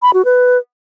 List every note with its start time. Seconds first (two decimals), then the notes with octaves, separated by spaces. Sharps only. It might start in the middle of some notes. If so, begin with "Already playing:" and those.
0.02 B5
0.13 F#4
0.25 B4